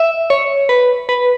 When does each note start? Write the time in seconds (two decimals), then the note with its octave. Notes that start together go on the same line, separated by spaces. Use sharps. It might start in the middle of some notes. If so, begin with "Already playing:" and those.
Already playing: E5
0.30 C#5
0.69 B4
1.09 B4